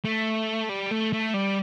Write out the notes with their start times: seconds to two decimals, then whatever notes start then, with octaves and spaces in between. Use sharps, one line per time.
0.05 A3
0.69 G3
0.91 A3
1.13 A3
1.34 G3